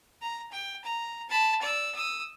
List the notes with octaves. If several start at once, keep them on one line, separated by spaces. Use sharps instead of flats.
A#5
G5
A#5
A5 B5
D5 E6
D#6 E6